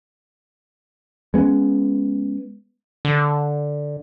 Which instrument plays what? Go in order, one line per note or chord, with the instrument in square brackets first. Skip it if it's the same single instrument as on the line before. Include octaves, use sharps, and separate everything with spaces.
[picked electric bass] G#3 B3 C#4
[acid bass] D3